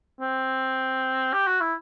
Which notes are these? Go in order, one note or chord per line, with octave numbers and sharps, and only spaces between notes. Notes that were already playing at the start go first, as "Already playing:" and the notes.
C4
G4
F#4
E4